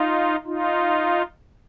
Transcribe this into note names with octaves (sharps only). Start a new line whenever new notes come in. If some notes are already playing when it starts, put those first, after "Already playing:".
Already playing: D#4 F4
D#4 F4